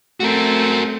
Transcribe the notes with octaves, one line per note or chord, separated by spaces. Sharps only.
A3 C4 F#4 A#4